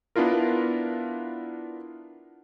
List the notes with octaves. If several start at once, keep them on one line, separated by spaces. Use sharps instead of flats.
B3 D4 E4 F4 A#4